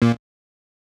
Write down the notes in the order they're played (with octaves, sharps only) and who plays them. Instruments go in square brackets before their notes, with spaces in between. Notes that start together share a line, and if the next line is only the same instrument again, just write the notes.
[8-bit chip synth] A#2 A#3